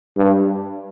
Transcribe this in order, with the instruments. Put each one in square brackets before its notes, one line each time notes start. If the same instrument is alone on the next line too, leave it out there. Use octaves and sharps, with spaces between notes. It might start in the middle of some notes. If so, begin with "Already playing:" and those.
[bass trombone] G2